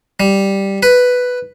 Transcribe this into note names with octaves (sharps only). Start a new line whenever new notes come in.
G3
B4